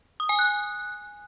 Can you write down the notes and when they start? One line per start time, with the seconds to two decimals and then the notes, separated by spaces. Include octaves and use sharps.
0.20 D#6
0.29 G#5
0.39 F#6